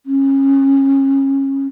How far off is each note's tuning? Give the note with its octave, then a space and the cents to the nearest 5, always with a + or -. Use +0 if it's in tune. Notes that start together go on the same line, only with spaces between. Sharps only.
C#4 -25